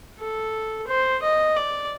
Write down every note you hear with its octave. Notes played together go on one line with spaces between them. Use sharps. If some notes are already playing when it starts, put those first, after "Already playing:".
A4
C5
D#5
D5